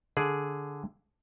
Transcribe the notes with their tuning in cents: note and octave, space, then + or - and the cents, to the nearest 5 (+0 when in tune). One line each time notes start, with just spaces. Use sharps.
D3 -5 G#4 +0 D5 +0